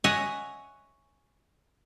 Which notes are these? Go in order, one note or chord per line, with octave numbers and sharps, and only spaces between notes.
C#5 D#5 E5 F#5 G#5